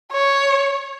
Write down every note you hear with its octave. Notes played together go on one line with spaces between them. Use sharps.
C#5